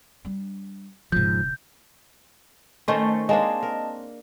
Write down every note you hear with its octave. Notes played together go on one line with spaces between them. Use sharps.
G3 D4
E1 G#2 C#3 F3 G6
D#3 A3 C#4 C5 D#5 C6
G#3 A#3 C4 D4 C#5 D#5 A5
A#4